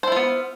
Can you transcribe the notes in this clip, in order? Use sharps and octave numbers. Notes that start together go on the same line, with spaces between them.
B3 E4 F4 C5